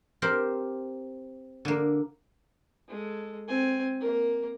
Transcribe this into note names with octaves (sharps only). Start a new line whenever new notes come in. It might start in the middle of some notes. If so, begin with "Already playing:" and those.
C4 G4 A#4 F5
D3 A#3
G#3 A4
C4 G#5
A#3 A#4